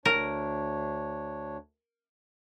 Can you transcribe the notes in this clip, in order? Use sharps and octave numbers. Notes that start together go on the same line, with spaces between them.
D2 D4 A#4 C#5